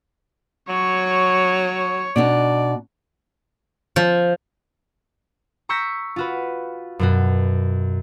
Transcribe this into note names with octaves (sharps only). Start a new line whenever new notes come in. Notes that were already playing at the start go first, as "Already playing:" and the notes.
F#3 C#5 C#6
B2 D4 D#4 D5
F3
A#5 C#6 E6 G6 A#6 B6
F4 F#4 B4
F#2 B2 F#4